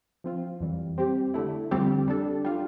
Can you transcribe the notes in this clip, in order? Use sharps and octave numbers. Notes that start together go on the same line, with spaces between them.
F3 C4 F4
F2 E3 G3
G3 C4 G4
D3 A3 E4
F2 D3 G3 C4 G4
G3 D4 A4
G3 D4 F4